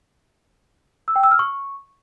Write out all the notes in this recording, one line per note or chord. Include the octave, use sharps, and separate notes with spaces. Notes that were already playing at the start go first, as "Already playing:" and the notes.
E6
G5
E6
F6
C#6